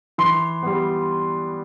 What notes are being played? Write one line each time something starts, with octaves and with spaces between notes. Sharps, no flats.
E3 C6
G3 B3